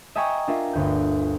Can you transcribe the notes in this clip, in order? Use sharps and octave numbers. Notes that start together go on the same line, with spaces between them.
D#5 E5 G5 G#5 A#5 C#6
D4 F4 A#4 E5
G1 D2 G6